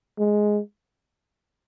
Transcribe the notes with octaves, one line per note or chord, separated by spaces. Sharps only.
G#3